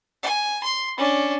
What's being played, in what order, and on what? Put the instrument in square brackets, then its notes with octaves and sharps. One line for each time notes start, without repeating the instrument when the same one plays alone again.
[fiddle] G#5
C6
C#4 D4